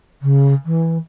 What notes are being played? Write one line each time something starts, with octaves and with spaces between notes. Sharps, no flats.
C#3
E3